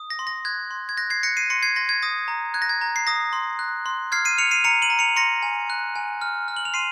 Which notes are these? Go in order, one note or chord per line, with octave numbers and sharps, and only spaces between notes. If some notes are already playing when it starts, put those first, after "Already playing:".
Already playing: D#6
A#6
C6
A#6
F#6 G#6
C6
G#6
F#6 A#6
G#6 C7
F#6 A#6 C#7
C7 D#7
C6 A#6 C#7
G#6 C7
C6 A#6
G#6
D#6 A#6
A#5
F#6 G#6
A#6
G#6
A#5
C7
D#6 A#6
C6
F#6
C6
F6 G#6 C7
C7 D#7
F6 C#7 F7
C7 D#7
A#5 C#7 F7
D#7 F#7
A#5
C#7 F7
C6 A#6 C#7
G#5
F#6
G#5
F6
F6
F#7
F7
C6 C7 D#7